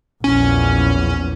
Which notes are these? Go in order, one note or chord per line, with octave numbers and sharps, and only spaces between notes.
A#1 E2 C#4